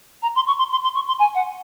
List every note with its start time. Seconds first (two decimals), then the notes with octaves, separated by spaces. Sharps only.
0.22 A#5
0.35 C6
0.47 C#6
0.58 C6
0.71 C6
0.83 C6
0.95 C#6
1.07 C6
1.19 G#5
1.35 F#5